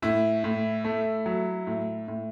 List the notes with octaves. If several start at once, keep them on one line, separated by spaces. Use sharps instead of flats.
A2 E4
A2
A3
F#3
A2
A2